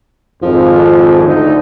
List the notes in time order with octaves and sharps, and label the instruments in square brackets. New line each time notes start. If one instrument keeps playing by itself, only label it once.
[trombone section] G#1 F2 [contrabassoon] F3
[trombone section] D2 D#4